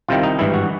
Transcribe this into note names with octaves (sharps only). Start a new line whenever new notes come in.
C2 C3 D#3 F4
D#4
G#1 G2 E3 E4
F#4